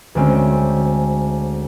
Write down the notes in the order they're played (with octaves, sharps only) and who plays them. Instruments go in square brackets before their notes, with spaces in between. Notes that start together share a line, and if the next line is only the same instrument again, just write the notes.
[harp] D2 G#3 C4 C#4